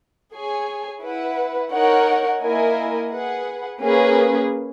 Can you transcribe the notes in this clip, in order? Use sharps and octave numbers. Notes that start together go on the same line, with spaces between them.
G#4 C#5 G#5
E4 B4 F#5
D#4 A#4 C#5 F#5
A#3 E4 A#4 D#5 G#5
G#4 B4 F#5
A#3 C#4 G#4 B4